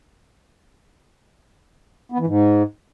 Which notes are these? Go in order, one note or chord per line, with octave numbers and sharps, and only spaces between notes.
B3
E3
G#2